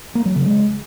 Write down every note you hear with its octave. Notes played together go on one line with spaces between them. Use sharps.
A#3
F#3
C#3
G#3